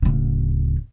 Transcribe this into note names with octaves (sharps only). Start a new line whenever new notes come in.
D1 C#3